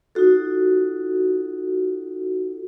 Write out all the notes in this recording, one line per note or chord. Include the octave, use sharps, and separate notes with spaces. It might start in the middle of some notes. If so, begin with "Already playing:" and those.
D#4 F4 F#4 A4